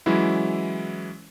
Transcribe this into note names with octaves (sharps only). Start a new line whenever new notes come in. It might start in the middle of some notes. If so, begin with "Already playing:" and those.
E3 F#3 G#3 C#4 E4